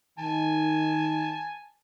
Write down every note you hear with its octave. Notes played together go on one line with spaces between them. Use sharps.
D#3 G#5 A5